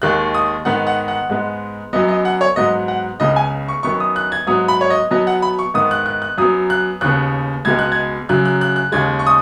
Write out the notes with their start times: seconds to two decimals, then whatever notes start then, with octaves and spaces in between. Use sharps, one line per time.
0.02 D#2 D#3 G#3 F#6
0.34 D#6
0.65 G#2 D#3 B3 F#5
0.87 F#5
1.08 F#5
1.30 G#2 G#3 B3
1.93 F#2 F#3 B3 D#5
2.08 D#5
2.25 F#5
2.41 C#5
2.56 G#2 F#3 B3 D#5
2.88 F#5
3.20 C#2 C#3 B3 D#5
3.36 G#5
3.68 C#6
3.83 F#2 D#3 B3 C#6
4.00 D#6
4.16 F#6
4.32 G#6
4.47 G#2 F#3 B3 D#6
4.68 B5
4.81 C#5
4.90 D#5
5.11 B2 F#3 B3 D#5
5.27 F#5
5.42 B5
5.59 C#6
5.74 G#2 D#3 B3 D#6
5.91 F#6
6.06 F#6
6.22 F#6
6.38 F#2 F#3 B3 D#6
6.70 F#6
7.01 D#2 C#3 B3 F#6
7.65 C#2 B2 G#3 B3 G#6
7.79 F#6
7.92 G#6
8.29 F#2 C#3 F#3 F#6
8.45 F#6
8.61 F#6
8.76 F#6
8.92 D#2 C#3 G#3 G#6
9.19 C#6
9.27 D#6